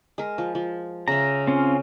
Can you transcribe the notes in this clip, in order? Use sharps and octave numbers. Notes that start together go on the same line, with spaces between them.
G#3 A#4
F3
F3
C#3 E5 A#5
C4 C#4 F4